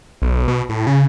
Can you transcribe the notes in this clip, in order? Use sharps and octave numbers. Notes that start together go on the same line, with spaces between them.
B1
B2
A2
C#3